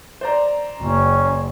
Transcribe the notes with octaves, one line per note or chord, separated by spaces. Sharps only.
C5 D5 A#5
F#1 C#4